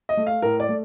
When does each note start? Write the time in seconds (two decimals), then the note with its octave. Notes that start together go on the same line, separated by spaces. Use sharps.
0.09 D#5
0.17 A3
0.27 F5
0.42 A2 A#4
0.60 D5
0.69 A3